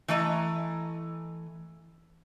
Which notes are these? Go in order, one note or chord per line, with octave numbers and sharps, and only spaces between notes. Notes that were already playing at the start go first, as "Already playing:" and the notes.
E3 A3 D#5 A#5